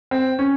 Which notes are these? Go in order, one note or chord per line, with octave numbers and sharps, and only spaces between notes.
C4
C#4